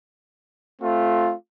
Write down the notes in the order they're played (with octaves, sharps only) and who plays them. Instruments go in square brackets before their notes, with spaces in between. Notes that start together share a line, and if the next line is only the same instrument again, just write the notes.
[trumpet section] A3 C4 F4